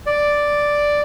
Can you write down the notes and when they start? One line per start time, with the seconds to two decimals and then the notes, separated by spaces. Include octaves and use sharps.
0.06 D5